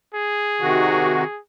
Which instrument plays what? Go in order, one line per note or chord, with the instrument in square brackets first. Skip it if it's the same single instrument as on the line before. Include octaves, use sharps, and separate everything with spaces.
[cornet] G#4
[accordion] C3 D#3 F#4